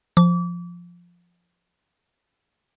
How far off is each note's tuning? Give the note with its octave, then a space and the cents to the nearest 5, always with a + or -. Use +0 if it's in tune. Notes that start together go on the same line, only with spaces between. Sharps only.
F3 +0 D6 -30